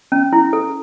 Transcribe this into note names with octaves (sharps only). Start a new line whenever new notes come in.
C#4
E4
A4